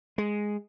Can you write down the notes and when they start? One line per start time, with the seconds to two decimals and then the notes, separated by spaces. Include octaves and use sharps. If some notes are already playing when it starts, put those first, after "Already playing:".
0.18 G#3